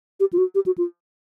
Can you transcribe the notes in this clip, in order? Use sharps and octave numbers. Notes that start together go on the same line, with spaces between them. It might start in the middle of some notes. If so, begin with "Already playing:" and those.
G4
F4
F#4
G4
F#4
F4